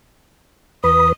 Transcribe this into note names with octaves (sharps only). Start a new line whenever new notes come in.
E2 B4 D#6